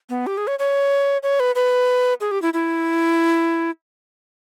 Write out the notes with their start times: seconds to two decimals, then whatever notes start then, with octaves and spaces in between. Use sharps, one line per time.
0.10 B3
0.27 G4
0.37 G#4
0.47 C#5
0.59 C#5
1.23 C#5
1.40 B4
1.55 B4
2.21 G#4
2.31 G4
2.42 E4
2.54 E4